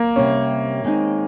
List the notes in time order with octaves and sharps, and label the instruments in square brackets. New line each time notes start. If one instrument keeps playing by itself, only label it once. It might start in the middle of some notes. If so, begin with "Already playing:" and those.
Already playing: [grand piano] A#3
[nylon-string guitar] C3 G3 C4 [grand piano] C#4
[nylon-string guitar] D#3 G#3 C4 D#4